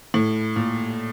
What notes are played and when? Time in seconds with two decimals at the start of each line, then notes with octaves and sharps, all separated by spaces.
0.14 A2
0.56 A#2